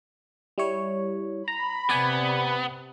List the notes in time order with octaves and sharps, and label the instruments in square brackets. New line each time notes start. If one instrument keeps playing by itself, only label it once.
[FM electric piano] G3 E4 C#5
[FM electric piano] A#5 [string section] B5
[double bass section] C3 [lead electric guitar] B3 [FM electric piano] D5 G#5